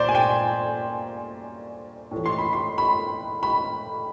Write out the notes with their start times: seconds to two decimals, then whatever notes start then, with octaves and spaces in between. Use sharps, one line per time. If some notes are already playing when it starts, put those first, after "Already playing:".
Already playing: A#2 C5 D5
0.09 G#5
0.15 G5
2.11 A2
2.16 E3
2.26 C6
2.38 B5
2.53 C6
2.78 B5
3.43 B5